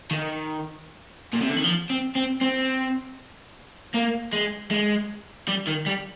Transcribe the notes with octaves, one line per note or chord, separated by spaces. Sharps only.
D#3
A#2
C3
D3
D#3
F3
C4
C4
C4
A#3
G#3
G#3
G3
D#3
G3